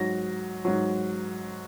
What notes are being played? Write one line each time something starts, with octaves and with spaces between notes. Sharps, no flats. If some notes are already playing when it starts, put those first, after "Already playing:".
Already playing: G#2 F#3 A#6
G#2 F#3